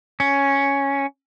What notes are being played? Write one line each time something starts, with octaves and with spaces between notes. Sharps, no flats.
C#4